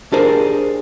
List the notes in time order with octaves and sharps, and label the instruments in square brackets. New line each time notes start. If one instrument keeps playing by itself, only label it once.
[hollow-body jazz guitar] D4 G4 G#4 A#4 C5